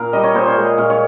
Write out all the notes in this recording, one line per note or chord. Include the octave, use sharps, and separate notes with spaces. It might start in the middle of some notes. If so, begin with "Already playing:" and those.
Already playing: A#2 A#4 F5
G3 D#5
C#5
A#2 C5
C#5
G#3
A#2 F5
C#5